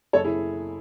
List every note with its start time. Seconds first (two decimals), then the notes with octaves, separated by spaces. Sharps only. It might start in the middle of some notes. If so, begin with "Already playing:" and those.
0.13 F#1 A4 C#5
0.24 E4 G#4